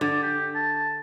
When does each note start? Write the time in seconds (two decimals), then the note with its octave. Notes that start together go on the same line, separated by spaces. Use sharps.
0.01 D3 D5
0.23 G4
0.55 A5